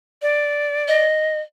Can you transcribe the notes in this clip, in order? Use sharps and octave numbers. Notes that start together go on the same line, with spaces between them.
D5
D#5